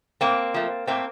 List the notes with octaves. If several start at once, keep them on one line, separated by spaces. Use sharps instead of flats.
A2 A#3 C4
F3 A3
A2 A#3 C4